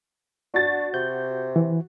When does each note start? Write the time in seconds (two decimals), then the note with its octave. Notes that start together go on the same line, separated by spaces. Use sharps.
0.54 D4 F#4 A6
0.94 C3 G6
1.56 E3